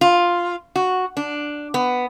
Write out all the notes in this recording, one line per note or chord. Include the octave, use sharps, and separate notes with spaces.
F4
F#4
D4
B3